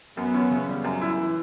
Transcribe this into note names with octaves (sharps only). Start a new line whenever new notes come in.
F#2 B3
C#4
C#3
G3
F#2
E4
E3